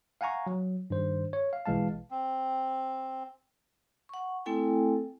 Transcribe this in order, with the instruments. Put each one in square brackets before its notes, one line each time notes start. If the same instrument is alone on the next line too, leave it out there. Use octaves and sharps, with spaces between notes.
[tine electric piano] F5 F#5 G#5 A#5 C#6
F#3
G2 D#3 C5
C#5
F5
A#1 B2 E3 G#3 F5 A5
[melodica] C4
[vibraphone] F#5 C#6
A3 C4 E4 A4 G5 G#5